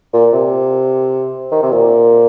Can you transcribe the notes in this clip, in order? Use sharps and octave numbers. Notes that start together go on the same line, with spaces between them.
A#2
C3
D#3
C3
A#2